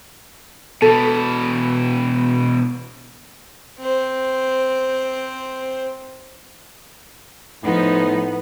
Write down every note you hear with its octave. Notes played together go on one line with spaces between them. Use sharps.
B2 E3 A4
C4 C5
A2 F3 B3 D#4